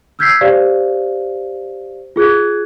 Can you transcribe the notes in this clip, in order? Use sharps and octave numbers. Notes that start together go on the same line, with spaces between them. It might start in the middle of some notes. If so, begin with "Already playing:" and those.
E6 F6 G6 G#6 B6 C7
G4 C5 D5 F5
F4 G#4 F#6 G#6